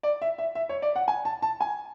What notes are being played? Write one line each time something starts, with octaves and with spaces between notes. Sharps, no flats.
D5
E5
E5
E5
C#5
D5
F#5
G#5
A5
A5
G#5